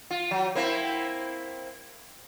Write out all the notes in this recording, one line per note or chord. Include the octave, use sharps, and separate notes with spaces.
F4
F#3
A#3 C4 E4